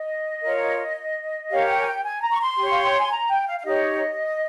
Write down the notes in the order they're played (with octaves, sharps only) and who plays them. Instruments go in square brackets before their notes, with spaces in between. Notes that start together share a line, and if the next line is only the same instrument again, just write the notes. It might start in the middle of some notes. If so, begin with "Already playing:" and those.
Already playing: [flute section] D#5
F4 A#4 C#5
G4 A#4 C#5 F5
G#5
G5
G#5
G5
G#5
A#5
C#6
C6
G4 C#5
F5
G5
G#5
A#5
G5
F5
F5
D#4 G4 C#5 D#5